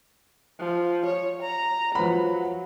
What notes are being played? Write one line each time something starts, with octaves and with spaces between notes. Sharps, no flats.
F3
C#5
A#5
F3 F#3 B4 B5